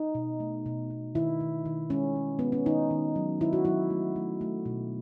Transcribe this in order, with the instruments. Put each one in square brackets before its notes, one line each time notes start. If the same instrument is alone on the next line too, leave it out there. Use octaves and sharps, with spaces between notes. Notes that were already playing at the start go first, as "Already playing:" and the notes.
Already playing: [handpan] D#4
B2
A3
B2
B2
D#3 E4
D#3
D#3
G#3 C#4
G#3
G#3 B3
C#4
D#3 D#4
D#3
F#3
D#3 E4
F#4
F#3 E4
A3
A3
A3
B2